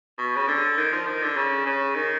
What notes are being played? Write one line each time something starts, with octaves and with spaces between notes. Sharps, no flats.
B2
C#3
D3
D#3
F3
D#3
D3
C#3
C#3
D#3